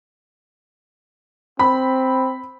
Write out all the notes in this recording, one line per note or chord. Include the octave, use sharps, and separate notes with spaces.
C4 B5